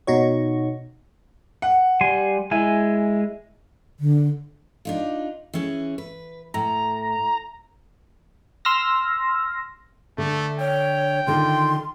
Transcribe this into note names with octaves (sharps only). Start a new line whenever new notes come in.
B2 D#4 F#4 C#5
F#5
G3 G#5 C6
G#3 E4 G#5
D3
D4 D#4 F4
E3 C#4 G#4
B4
A2 A#5
C6 E6 F6 A#6
D3 A3
C#5 G5
D3 D#3 F4 C6